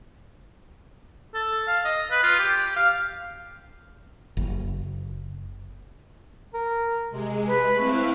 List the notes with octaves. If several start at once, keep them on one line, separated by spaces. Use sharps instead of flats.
A4
F5
D#5
B4
F4
G4
F5
F#1
A#4
C3 G#3
B4
A3 C4 E4 F5